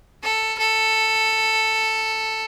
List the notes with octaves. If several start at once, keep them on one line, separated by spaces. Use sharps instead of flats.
A4
A4